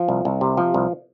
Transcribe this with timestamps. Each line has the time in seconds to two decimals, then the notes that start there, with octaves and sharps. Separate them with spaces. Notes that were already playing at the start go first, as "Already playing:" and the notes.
Already playing: F3
0.09 C2
0.25 C2
0.41 C3
0.57 F3
0.74 C2